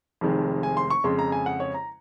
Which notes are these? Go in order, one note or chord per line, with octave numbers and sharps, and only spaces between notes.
F1 F2 D#3 G#3
G#5
C6
C#6
F2 C#3 G#3 C6
A#5
G#5
F#5
C#5
A#5